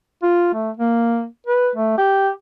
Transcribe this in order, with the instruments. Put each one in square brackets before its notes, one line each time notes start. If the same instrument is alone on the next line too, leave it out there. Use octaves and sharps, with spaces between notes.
[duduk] F4
A3
A#3
B4
A3
G4